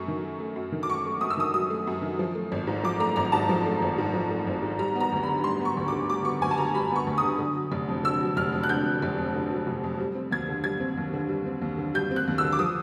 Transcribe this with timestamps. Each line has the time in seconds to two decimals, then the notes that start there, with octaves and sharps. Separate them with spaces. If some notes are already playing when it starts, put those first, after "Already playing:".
Already playing: F#2 F#3 A3 C#6
0.08 D#3
0.23 F#3
0.40 A3
0.56 F#2
0.72 D#3
0.83 D6
0.89 F#3 C#6
1.06 A3
1.21 F#2 D#6
1.30 E6
1.37 D#3 D#6
1.54 F#3 D#6
1.70 A3
1.87 F#2
2.02 D#3
2.19 F3
2.35 A3
2.52 G#1
2.67 G#2
2.83 F3 D6
3.00 A3 A#5
3.16 G#1 A#5
3.32 G#2 A5
3.49 F3
3.66 A3
3.82 G#1
3.98 G#2
4.13 F3
4.30 A3
4.47 G#1
4.62 G#2
4.79 G3 A#5
4.95 B3
5.00 A#5
5.12 D2
5.23 D3 B5
5.44 G3 C6
5.60 B3
5.65 C#6
5.77 D2
5.88 D3 D6
6.10 G3 D6
6.25 B3 C#6
6.41 D2 G#5
6.51 A5
6.58 D3 A#5
6.74 G3 B5
6.91 B3 C#6
7.07 D2
7.18 D3 D#6
7.39 D3
7.55 F#3
7.72 F1
7.89 F2
8.04 D3 E6
8.20 F#3
8.37 F1 F6
8.52 F2
8.63 F#6
8.69 D3 G6
8.86 F#3
9.02 F1
9.18 F2
9.35 D3
9.50 F#3
9.67 F1
9.84 F2
10.00 G3
10.15 C4
10.31 D#2 G#6
10.48 D3
10.64 G3 G#6
10.80 C4
10.97 D#2
11.14 D3
11.29 G3
11.46 C4
11.62 D#2
11.78 D3
11.94 G3 G6
12.11 C4
12.16 F#6
12.28 D#2
12.38 E6
12.44 D3
12.53 D6
12.59 F3 D#6